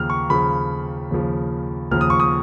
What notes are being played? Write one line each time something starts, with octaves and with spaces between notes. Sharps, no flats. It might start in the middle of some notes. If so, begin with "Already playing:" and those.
Already playing: D#2 C#3 F3 F6
C#6
D#2 C#3 F3 B5
D#2 C#3 F3
D#2 C#3 F3 F6
D#6
C#6
D#6